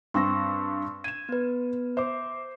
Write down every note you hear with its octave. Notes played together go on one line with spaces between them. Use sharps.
G2 C4 C6 C#6 E6 A#6
G#6 D#7 E7
B3 B4
C5 E5 D6